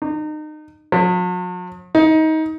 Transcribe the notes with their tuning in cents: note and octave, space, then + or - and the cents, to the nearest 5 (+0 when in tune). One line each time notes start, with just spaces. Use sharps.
D#4 -30
F#3 -45
D#4 +25